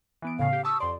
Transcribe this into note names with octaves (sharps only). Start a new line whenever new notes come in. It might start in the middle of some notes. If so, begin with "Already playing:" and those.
E3 B3 D7
A2 C#3 F5
G4
A5 C#6 D#6 E6
F2 D5 C6